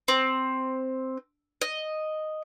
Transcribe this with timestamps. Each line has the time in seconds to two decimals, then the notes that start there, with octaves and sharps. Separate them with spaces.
0.08 C4
1.62 D#5